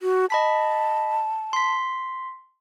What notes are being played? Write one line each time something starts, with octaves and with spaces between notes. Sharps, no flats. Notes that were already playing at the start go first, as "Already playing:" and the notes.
F#4
D#5 A5 B5 B6
C6 B6